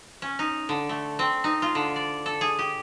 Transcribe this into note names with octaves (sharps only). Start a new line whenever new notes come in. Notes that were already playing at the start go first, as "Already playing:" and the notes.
C#4
D#4
D3
A3
C4
D#4
F4
D3
D5
A4
G#4
G4